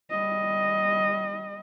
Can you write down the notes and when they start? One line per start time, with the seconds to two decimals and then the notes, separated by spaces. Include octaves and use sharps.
0.10 G3 D#5